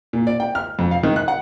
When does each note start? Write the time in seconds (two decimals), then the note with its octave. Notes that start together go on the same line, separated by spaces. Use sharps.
0.13 A#2
0.27 D5
0.40 G5
0.55 F6
0.79 F2
0.91 F5
1.03 D#3
1.16 F#6
1.28 F#5